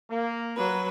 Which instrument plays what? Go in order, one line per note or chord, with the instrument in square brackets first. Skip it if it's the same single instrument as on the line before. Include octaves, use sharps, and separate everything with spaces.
[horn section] A#3
[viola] F#3 B4